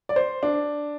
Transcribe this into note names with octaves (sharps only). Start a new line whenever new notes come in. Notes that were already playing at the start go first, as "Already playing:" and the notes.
D5
C5
D4